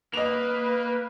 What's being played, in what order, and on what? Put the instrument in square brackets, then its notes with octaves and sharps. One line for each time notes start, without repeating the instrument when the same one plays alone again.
[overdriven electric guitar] A#3 [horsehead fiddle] B4 [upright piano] D#5 F7